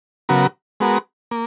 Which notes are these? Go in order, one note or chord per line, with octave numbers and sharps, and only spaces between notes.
C#3 F#3 B3 F#4 A#4
G#3 B3 F#4 A#4
A#3